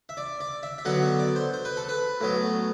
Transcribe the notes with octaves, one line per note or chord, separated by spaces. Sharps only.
E5
D5
D5
E5
E5
D3 F#3 B3 F#5
E5
D5
C5
C5
B4
A4
B4
A2 F#3 B3